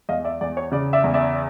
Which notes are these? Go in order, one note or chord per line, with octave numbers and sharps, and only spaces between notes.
E2 D#5 F5
D5 E5
E2 D5
C#5
C#3 D5
D5 E5
E2
D5 E5